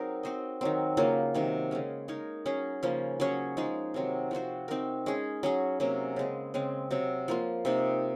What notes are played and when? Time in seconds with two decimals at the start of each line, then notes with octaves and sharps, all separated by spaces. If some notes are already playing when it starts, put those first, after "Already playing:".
Already playing: F#3 C4 D#4 G#4 A#4
0.23 C4 F#4 C5 D#5
0.61 D#3 F#3 C4
0.97 C#3 F#3 A#3 F4
1.34 C3 D#3 F#3
1.71 C#3 G#3 C#4
2.08 G#3 D#4 A#4 C#5
2.46 F#3 C#4 G#4
2.83 C#3 F3 A#3 C#4
3.20 F#3 C#4 G#4 C#5
3.57 F3 G#3 D#4 G#4
3.94 C3 D#3 F#3 C4
4.31 F3 C4 F#4 C5
4.68 C4 D#4 A#4
5.06 G#3 C#4 G#4
5.43 F#3 C#4 G#4
5.80 C3 F#3 A#3 C#4
6.16 C#3 G#3 C4
6.54 C#3 G#3 C4
6.91 C3 F#3 C4
7.28 F3 A#3 F4
7.65 C3 F3 A#3 D#4